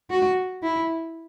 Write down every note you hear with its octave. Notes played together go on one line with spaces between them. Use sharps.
F#4
E4